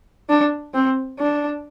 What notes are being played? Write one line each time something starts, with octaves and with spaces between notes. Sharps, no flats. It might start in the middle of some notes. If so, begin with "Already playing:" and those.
D4
C4
D4